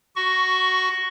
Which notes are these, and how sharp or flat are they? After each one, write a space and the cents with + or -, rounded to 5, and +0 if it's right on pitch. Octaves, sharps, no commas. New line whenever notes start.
F#4 +10 C#6 +0